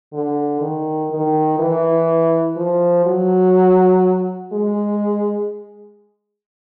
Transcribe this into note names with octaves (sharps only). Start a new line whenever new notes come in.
D3
D#3
D#3
E3
F3
F#3
G#3